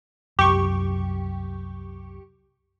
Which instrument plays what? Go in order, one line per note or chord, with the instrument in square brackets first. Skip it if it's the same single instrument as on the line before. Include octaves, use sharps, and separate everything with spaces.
[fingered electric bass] C2 F#2 [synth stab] G4 C#6